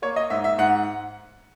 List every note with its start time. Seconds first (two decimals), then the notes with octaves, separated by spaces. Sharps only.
0.02 A#3 C#5
0.16 D#5
0.30 G#2 E5
0.44 E5
0.58 G#2 F#5